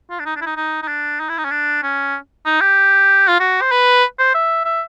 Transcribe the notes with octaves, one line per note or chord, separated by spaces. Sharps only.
F4
D4
D#4
D4
E4
D#4
D#4
D#4
D4
D#4
E4
D#4
C#4
D4
C#4
D#4
G4
F4
F#4
C5
B4
C5
E5
E5